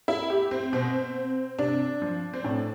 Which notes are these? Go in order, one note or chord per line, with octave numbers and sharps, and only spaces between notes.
E4
G4
C4
B2 C4
C3 D4
F3
C4
A2 D4